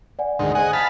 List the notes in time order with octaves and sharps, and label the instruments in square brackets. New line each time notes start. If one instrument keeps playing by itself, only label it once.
[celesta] D5 F#5 G#5
[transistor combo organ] D2 G#2 D#3 [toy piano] C6
[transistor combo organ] G#4 D#5 F#5 [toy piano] C5 G#5
[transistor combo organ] F5 A5 B5 [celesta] D#6 B6